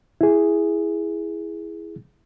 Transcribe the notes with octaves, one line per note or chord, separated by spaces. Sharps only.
E4 G#4